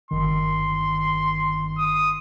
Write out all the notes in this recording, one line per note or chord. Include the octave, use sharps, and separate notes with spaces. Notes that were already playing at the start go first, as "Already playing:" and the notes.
G1 D#3 C6
D#6